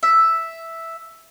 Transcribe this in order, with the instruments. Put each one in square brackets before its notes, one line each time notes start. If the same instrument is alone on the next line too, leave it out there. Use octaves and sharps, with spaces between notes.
[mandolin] E5